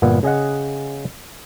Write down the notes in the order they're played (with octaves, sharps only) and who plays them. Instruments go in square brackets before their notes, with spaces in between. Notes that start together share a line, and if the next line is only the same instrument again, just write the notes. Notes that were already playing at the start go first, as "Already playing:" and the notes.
[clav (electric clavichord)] G1 A#2 B3 F#5
C#3 G#4 D#5 F#5